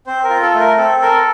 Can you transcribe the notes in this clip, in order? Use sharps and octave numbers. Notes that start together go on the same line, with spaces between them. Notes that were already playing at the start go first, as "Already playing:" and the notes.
C4 C5
A#4
F4
A4
A3
A#4
C4 A4
A4 A#4